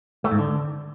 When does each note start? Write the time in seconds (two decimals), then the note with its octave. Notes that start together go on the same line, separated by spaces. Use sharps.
0.24 A3
0.32 G#2
0.39 D3